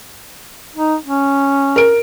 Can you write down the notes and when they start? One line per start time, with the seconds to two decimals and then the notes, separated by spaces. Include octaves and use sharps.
0.76 D#4
1.05 C#4
1.76 A#4 D7